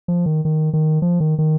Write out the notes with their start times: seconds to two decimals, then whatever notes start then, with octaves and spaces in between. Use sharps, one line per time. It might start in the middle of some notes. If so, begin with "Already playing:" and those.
0.08 F3
0.26 D#3
0.45 D#3
0.73 D#3
1.02 F3
1.20 D#3
1.39 D#3